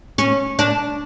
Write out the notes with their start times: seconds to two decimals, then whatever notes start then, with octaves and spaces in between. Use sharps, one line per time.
0.18 C#4
0.59 D4